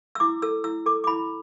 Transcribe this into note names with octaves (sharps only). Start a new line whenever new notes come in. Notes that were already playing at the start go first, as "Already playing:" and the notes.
E6
E4 D6
A4 E6
E4 E6
A4 D6
D6
E4 B5